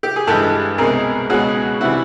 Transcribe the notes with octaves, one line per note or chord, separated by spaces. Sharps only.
G4
G#4
G2 E3 G#3 G4 A4
C2 B2 G#3 G#4 A#4
C#2 B2 G#3 F#4 G#4
C3 E3 G3 E4 F#4